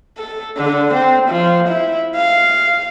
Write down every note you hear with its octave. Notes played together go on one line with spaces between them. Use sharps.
A4
D3
C4
F3
E4
F5